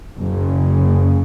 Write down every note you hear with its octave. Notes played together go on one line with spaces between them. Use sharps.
F#1 F#2 C#3